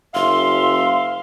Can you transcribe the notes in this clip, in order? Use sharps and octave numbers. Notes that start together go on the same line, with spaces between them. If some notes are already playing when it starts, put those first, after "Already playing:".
F#1 E5 F5 C6